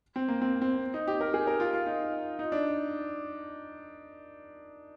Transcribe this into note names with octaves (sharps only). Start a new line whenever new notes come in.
C4
A#3
C4
C4
D#4
G4
A#4
G#4
A#4
F4
F4
D#4
D#4
D4